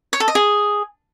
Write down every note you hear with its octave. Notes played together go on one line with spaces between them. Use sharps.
C#5
A4
D#5
G#4